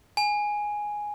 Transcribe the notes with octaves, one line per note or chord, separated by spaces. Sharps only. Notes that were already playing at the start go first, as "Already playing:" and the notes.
G#5